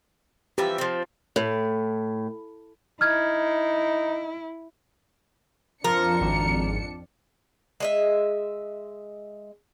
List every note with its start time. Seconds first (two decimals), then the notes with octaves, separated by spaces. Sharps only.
0.58 E3 F3 G4 E5
0.78 F3 C4
1.36 A2
3.01 D#4 E4 F6 G#6
5.84 F2 F3 D4 F4 A#4 C#7
6.21 G#1
7.80 G#3 D#5 E5